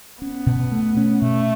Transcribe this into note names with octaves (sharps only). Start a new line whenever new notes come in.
B3 C#4
B2
A3
C#4
B2 A3